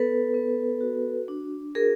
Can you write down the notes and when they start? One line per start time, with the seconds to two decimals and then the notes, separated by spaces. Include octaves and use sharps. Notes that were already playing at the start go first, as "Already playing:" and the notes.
Already playing: B3 A4 B4
0.34 B3
0.81 F#4
1.28 D4
1.75 F#4 G#4 A#4